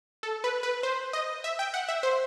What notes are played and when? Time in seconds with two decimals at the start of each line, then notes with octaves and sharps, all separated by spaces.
0.23 A4
0.44 B4
0.63 B4
0.83 C5
1.13 D#5
1.44 E5
1.59 G5
1.74 F#5
1.88 E5
2.03 C5